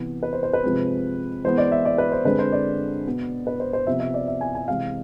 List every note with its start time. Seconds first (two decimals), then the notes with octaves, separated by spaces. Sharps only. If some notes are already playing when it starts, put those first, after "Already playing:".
Already playing: C3 E3 B3
0.23 B4
0.33 C5
0.43 C5
0.53 B4
0.64 C3 F3 G#3 C4
1.44 E3 G#3 B3 C5
1.58 D5
1.72 E5
1.85 D5
1.98 B4
2.12 C5
2.25 D3 G#3 C4 B4
2.39 C5
2.52 D5
3.06 B2 B3
3.47 B4
3.60 C5
3.73 C5
3.87 C3 F3 B3 E5
4.00 E5
4.14 D5
4.28 E5
4.41 G#5
4.55 G#5
4.68 C3 E3 G#3 F5